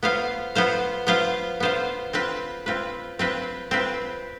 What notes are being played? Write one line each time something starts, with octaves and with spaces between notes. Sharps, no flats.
B3 F4 C5 F5
B3 F4 C5 F5
B3 F4 C5 F5
B3 F4 C5 F5
C4 F4 B4
C4 F4 B4
C4 F4 B4
C4 F4 B4